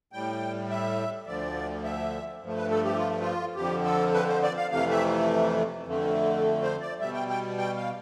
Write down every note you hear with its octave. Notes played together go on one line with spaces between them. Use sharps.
A2 G3 G5
E5
D2 D3 F3 D5
E5
G2 F3 A3
B4
A4
G4
F4
F4
F2 D3 F3 G4
A4
B4
C5
D5
F5
F2 C3 E3 A3 F5
E5
F2 D3 A3
C5
D5
B2 G3 E5
G5
G5
G5
F5